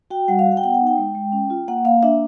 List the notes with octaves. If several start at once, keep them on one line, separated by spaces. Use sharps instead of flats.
F#4 G5
G3 F#5
F5
F#4
F#5
G5
B3 F#5
F#5
D#4
G5
G#3
G#3
C#4
F4
A#3 F#5
A#3 F5
D4 E5